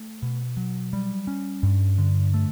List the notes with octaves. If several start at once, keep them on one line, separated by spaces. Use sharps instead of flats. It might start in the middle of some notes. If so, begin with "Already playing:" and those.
Already playing: A3
B2
F#3
G3
C#4
G2
D3
A3